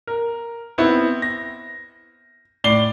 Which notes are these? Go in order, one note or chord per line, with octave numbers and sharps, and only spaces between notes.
A#4
B3 C4 E4
A#6
A2 D5 C7 G7